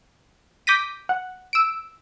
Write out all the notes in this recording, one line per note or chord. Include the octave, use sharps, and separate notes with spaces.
D6 G6 A#6 B6 D#7
F#5
E6 D7